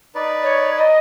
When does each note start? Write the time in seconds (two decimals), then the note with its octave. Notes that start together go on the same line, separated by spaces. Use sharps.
0.15 D#4 B4 D5
0.43 C#5
0.77 D#5